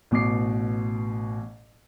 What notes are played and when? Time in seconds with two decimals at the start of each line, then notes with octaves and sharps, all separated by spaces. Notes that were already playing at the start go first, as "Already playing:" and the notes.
0.11 A1 B2 D6 C7